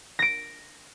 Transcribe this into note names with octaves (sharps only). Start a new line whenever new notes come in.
A#6 D7